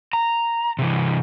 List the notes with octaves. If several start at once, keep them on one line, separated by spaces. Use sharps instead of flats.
A#5
C3 E3